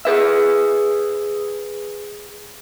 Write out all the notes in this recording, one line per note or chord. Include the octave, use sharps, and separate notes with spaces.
G#4 B4 E5